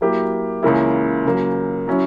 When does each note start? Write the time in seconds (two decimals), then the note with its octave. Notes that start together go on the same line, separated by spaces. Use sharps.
0.01 F#3 A#3 E4 G4
0.63 C#2 C#3 E3 A#3 E4
1.25 C#3 F#3 A#3
1.87 F#3 C#4 E4